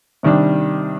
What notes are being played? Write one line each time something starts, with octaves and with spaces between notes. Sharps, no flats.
C3 D#3 G3 D4